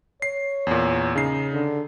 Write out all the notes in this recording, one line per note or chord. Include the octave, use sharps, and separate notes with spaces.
C#5 C7
E2 A#2
C#3 D#4 C7
D3